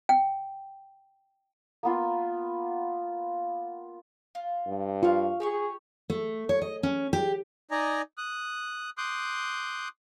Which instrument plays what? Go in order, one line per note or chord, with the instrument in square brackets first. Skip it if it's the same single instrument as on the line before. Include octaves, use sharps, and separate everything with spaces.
[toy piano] G5
[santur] A#3 B3 F4
[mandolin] F4
[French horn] G2
[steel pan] F4 [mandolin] F5 C#6
[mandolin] G4 C#5 C#6 [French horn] G#4
[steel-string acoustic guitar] A3
C#5
D#5
C#4
G4
[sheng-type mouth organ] D#4 D5 D#5 G#5 A#5
D#6 F#6
C6 D6 D#6 F#6 G6